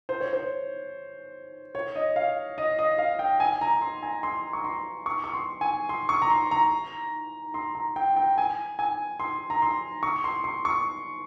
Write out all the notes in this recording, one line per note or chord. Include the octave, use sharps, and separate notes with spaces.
C5
C#5
C5
C#5
D#5
F5
D#5
D#5
F5
G5
G#5
A#5
C6
G#5
C6
C#6
C6
C#6
C#6
C6
G#5
C6
C#6
A#5
C6
A#5
C6
A#5
G5
G5
G#5
G#5
C6
A#5
C6
C#6
C6
C6
C#6